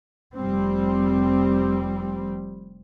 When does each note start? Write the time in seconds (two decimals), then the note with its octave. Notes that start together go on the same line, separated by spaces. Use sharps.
0.36 F1 G3 C4